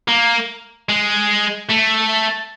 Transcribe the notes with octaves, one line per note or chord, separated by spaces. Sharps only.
A#3
G#3
A3